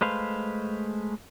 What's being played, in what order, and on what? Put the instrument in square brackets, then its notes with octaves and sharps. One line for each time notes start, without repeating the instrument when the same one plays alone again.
[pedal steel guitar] G#3 A3 B4 C5 F5